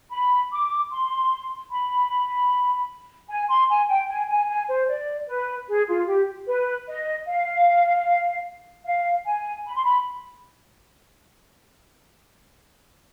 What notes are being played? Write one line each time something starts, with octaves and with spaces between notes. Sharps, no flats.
B5
D6
C6
B5
G#5
C6
G#5
G5
G#5
G#5
G#5
C5
D5
B4
G#4
F4
G4
B4
D#5
F5
F5
G#5
B5
C6
B5